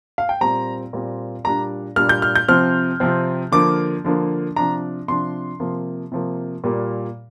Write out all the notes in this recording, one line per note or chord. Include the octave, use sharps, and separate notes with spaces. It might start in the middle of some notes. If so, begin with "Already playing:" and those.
F5
G5
A#2 G3 C4 A#5
A#2 G3 C4
A#2 G3 D4 A#5
A#2 G3 D4 F6
G6
F6
G6
C3 F3 C4 F6
C3 F3 C4
D3 F3 A#3 D6
D3 F3 A#3
C3 F3 D4 A#5
C3 F3 D4 C6
C3 F3 A#3
C3 F3 A#3
A#2 G3 A#3